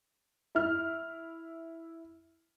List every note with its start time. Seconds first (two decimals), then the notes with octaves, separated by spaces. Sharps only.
0.55 E4 F6